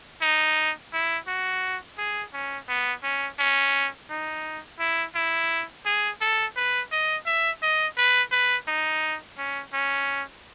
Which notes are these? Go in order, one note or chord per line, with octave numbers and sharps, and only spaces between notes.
D#4
E4
F#4
G#4
C#4
B3
C#4
C#4
D#4
E4
E4
G#4
A4
B4
D#5
E5
D#5
B4
B4
D#4
C#4
C#4